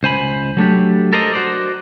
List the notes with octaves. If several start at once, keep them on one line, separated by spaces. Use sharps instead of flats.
C#2 C5 G#5 B5
F#3 A3 D4 G4
A4 A#4 C5 D5 D#5
F#4 C5 D5